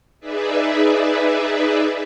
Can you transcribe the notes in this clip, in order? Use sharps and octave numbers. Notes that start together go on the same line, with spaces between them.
D#4 G#4 B4 D5 E5